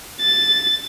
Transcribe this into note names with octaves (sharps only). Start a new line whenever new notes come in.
A6